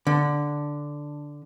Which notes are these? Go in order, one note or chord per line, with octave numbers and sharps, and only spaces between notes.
D3